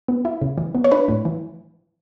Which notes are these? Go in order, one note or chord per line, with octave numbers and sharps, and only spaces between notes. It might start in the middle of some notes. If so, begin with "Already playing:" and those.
B3
E4
C#3
E3
B3
C#5
D4 B4
A2
E3